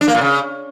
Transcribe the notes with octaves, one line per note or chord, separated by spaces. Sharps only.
D4
A#3
A#2
C#3